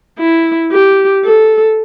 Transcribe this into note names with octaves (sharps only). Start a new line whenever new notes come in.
E4
G4
A4